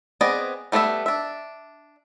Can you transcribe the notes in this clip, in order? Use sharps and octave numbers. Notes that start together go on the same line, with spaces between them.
B3 C4 G#4 D5 D#5
G3 A3 B3 D5 E5
D4 E5